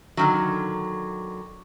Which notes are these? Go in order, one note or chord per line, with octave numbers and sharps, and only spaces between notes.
D3 D#3 F#3